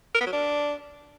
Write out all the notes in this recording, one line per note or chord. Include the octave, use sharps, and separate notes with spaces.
A#4
B3
F#3
D4